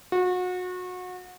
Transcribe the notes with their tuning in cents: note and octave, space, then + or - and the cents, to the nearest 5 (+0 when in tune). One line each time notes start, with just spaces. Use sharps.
F#4 -30